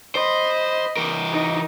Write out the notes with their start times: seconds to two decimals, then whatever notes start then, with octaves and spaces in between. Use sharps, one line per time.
0.15 C5 D#5 B5
0.97 E3 A#4
1.32 D#4